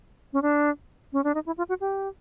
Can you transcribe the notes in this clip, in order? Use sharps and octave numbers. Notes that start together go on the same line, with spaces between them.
C#4
D4
C#4
D4
D#4
E4
F4
F#4
G4